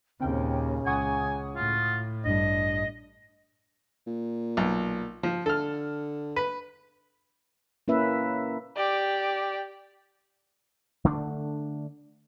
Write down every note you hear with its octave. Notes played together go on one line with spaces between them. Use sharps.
D#2 A#2 C#3 C4 G5
C#2 F#5 G#5 C#6 D#6
A2 F4
A1 G2 G3 D4 D#5
A#2
B1
F3
D3 A4 F6
B4
A#3 C#4 E4 B4 E5
G4 D5
D3 A3 D4